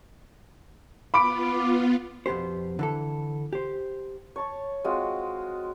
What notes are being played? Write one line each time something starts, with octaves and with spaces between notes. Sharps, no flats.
B3 F4 B5 D6 D7
F2 B2 B3 G4 C5
D3 E3 A4
G4 C5
C#5 A5 C#6
G#3 C4 F4 F#4